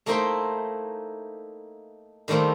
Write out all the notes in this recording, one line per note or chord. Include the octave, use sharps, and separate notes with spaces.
A3 A#3 D#4 E4 C5 G5
D#3 G3 A3 A#3 C4